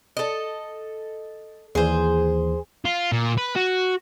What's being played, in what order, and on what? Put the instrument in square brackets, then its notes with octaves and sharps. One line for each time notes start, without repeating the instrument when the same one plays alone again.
[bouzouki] A4 D#5
[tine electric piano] D#2 E3 [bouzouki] G#4 C5
[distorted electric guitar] F4
A#2
B4
F#4